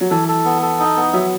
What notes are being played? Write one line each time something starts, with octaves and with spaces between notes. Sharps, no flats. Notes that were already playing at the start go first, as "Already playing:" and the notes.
F#3
E3 A4
A4
B3
A4
D#4
B3
F#3 E5